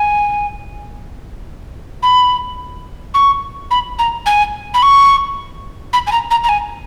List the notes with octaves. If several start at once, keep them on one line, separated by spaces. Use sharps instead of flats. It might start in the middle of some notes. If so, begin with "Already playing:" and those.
Already playing: G#5
B5
C#6
B5
A#5
G#5
B5
C#6
B5
G#5
A#5
A#5
A#5
G#5